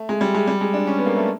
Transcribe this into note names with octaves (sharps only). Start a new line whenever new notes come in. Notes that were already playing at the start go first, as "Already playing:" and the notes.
Already playing: A3
G#3
G3
G#3
G3
G#3
D4
C#4
B3
A#3
A3